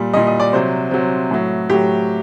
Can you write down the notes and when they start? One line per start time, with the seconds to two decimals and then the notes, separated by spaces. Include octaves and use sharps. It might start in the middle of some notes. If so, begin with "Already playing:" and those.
Already playing: A#2 G3
0.13 A#2 G3 D#5
0.27 D#5
0.40 D5
0.53 C3 F#3 C5
0.91 C3 F#3
1.31 A2 F#3
1.70 A2 F#3 G4